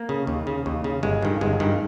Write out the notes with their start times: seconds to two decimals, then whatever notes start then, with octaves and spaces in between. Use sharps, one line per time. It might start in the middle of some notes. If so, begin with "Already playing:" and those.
Already playing: A#3
0.09 C#3
0.27 D#2
0.47 C#3
0.66 D#2
0.84 C#3
1.03 G1 G#3
1.22 G2 D#3
1.41 G1 G#3
1.60 G2 D#3